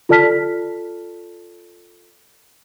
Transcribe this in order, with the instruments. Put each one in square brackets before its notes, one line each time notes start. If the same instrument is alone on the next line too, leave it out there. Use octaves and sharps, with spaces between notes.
[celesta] F4 A4 D5 A5 F6 B6